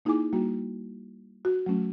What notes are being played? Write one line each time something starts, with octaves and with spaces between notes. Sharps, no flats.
A#3 D#4 E4 G#4 G#5 D6
G3 A#3 F#4
F#4
F#3 A3 C#4